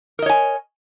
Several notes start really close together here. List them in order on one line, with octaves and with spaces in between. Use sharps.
A#4 D#5 C#5 G#5